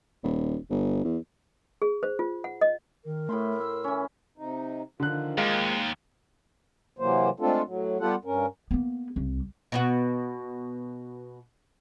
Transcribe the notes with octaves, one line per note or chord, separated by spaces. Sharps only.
D#1
G1
E2
G#4
C5
F4
F#5
D#5
D#3 A#4
A2 A3 B5 C6
E6
E3 C#4
C3 D#4
D3 D#3 F3 F#6
D#2 G#3 F5
C3 E3 F#3 A#3 C5
G#3 A3 C4 D4 F4 A4
A2 F#3
G3 B3 F4 G4 A4 F#5
G2 C#4 A#4
A#3 B3
C2
B2 B3 F#4